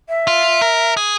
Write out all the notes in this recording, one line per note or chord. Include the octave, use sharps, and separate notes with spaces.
E5
F4
A#4
G#4